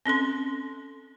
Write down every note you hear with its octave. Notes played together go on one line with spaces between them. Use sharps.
C4 C#4 A4 C6